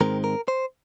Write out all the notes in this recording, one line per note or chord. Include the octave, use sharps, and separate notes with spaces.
G#2 D#3 G#3 C4 A#4
A#4
C5